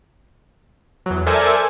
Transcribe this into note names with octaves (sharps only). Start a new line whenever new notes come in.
E2 F#3
A4 A#4 C5 D5 E5 G#5